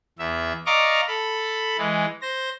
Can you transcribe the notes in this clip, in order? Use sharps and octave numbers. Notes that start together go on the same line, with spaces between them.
E2 E5
D5 D#5 F5 A#5 C#6 D6
A4 B5
E3 G#3
C5 A#6